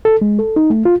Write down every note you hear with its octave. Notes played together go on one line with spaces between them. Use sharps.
A4
G#3
A4
D#4
A3
F4